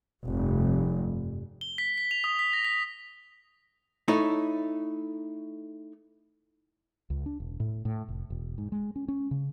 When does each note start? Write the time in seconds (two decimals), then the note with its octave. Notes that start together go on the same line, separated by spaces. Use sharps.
0.25 F1 G2
1.61 G7
1.78 B6
1.98 B6
2.11 F7
2.24 D#6
2.39 B6
2.53 A#6
2.65 B6
4.08 A3 D#4 E4 C#5
7.10 C#2
7.26 D4
7.40 E1
7.60 A2
7.85 A2
8.09 F1
8.30 E1
8.58 G#2
8.72 G#3
8.96 C#4
9.08 C#4
9.31 C#3